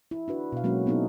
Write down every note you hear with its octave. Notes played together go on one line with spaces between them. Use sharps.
E4
D4 F#4 B4
B2 F5
F#3 G#3 A#3 C#4 F#4
F#3 B3 C4 D#4 E4 A4